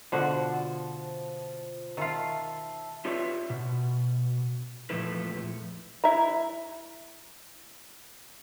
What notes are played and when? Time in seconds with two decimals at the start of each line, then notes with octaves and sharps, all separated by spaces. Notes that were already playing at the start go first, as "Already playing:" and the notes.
0.12 B2 D3 F3 F#4
1.97 D#3 F4 E5 A5
3.05 F4 G4 B4 C#5 D5 E5
3.50 B2
4.90 E2 A#2 F3 A3 E4 B4
6.04 E4 E5 A#5